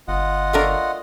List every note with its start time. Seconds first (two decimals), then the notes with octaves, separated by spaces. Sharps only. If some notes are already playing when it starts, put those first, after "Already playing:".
0.08 G1 F4 D#5 F#5
0.53 A3 D4 A#4